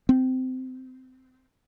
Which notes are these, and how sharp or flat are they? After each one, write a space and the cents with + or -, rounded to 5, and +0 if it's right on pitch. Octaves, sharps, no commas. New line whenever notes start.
C4 -20